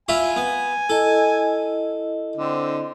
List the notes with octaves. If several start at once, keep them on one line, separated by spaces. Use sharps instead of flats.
E4 F4 E5 G#5
B3
E4 A4 D#5
D3 C4